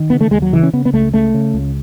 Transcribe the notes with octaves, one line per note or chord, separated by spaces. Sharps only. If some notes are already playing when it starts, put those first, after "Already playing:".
Already playing: D#3
C#3 B3
A3
D#2 G#3
F#3
C#3 E3
C#4
C#3 B3
B3
C#2 A3
C#3 A3
C#3
C#2